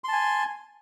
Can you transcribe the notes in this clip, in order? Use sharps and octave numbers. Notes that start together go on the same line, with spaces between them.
G#5 A5 C6